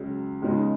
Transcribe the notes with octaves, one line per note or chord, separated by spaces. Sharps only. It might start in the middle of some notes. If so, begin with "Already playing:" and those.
Already playing: C#2 C#3 F#3
C#2 C#3 G#3 B3 D#4